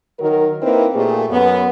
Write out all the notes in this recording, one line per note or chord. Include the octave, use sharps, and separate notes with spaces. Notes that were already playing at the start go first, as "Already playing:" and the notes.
D#3 F#3 A#4
A#3 C4 D#4 E4 A#4 B4
A#2 A3 A#3 G4 G#4
F#2 B3